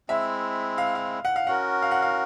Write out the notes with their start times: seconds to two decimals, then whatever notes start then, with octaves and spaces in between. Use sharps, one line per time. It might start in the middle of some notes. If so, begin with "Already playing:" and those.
0.09 G#3 C4 E4 E5
0.78 F5
0.95 F5
1.25 F#5
1.36 F5
1.47 C#4 F#4 A#4 F#5
1.82 F5
1.91 F#5
2.02 F5